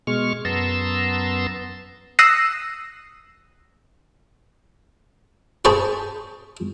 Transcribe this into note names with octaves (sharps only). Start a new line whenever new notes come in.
B2 G#3 C#6 F6
F#2 B3 A5 A#5 C6 E6
D#6 E6 F#6 A#6 C7 C#7
G#4 C5 A5 B5 C#6